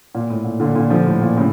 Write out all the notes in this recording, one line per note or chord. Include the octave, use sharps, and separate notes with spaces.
A#2
A2
A#2
A#2 D3
A#2 D3
D3 F3
A2
A#2
A2 C#3